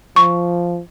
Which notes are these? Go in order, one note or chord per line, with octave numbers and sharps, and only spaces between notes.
F3 C#6